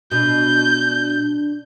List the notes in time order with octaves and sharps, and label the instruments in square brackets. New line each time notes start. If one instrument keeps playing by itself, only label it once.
[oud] B2 [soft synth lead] D4 [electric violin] G6